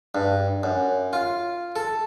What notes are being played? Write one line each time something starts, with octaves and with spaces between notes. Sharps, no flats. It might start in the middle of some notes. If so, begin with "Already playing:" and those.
G2
F#2
F4
A4